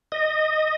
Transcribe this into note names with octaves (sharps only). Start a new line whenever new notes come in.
D#5